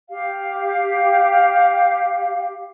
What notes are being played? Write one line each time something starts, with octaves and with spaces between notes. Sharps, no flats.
G4 F5